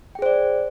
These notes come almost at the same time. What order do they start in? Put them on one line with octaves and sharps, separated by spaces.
G5 G#4 C5 D5